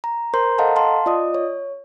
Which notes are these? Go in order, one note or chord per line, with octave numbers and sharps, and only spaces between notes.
A#5
A#4 C5 A#5 C6 G6
A4 D#5 F5 F#5 A5 A#5
F5 A5 C6
F4 D5 D#5 D#6
C#5